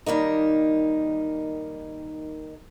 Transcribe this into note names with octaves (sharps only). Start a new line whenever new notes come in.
D#3 G3 A#3 D#4